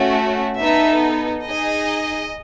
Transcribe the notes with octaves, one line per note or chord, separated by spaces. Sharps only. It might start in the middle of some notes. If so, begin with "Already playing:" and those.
Already playing: A3 C#4 F#4
B3 D#4 A4 E5
D#4 G#4 D#5